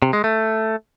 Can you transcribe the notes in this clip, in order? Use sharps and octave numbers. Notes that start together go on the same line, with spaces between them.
C3
G#3
A3